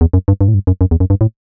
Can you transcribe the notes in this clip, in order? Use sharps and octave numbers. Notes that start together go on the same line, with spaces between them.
E2
F#2
G2
G2
A2
G2
F#2
F#2
E2
F#2
G2
A2